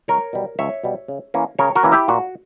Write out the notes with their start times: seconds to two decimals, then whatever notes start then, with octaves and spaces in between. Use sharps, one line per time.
0.08 C#2 A#4 C#5
0.33 B2 G3
0.59 C#2 C#5 E5
0.84 B2 G3
1.08 C#3
1.34 E3 A#3 C#4
1.59 C#3 A#4 C#5
1.76 F#4 A#4
1.83 E3 A#3 C#4
1.92 E4 G4
2.08 A#2 F#4